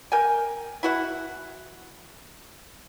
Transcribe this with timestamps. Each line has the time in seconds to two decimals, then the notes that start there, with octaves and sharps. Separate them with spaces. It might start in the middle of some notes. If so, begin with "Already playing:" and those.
0.12 A#4 G5 G#5
0.83 E4 F#4 F#5